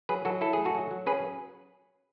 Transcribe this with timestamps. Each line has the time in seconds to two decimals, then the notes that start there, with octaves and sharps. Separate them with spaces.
0.09 F#3 G#4 B4
0.25 F#3 F#4 A4
0.41 E4 A4
0.53 A3 G#4
0.65 F#4 A4
0.75 F#3
0.91 F#3
1.06 C#4 G#4 B4